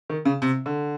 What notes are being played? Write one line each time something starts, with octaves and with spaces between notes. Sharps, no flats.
D#3
C#3
C3
D3